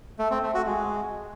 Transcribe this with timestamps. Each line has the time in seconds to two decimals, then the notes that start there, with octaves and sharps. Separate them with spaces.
0.19 A3
0.31 C4
0.42 A3
0.54 F#4
0.66 G#3